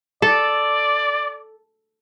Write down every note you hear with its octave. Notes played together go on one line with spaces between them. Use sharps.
A4 D5